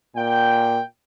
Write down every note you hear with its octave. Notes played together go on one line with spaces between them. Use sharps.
A#2 G5